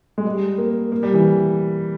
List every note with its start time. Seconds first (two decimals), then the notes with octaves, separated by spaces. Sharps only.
0.18 G#3
0.25 G3
0.58 A#3
0.92 A#3
1.03 G3
1.14 E3